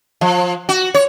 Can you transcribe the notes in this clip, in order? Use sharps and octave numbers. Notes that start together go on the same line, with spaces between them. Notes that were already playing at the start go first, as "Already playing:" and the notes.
F3
F#4
C#5